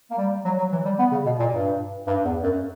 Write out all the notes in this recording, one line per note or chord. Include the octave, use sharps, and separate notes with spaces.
A#3
G3
F#3
F#3
E3
G3
B3
C#3
B2
A#2
G2
G2
E2
F#2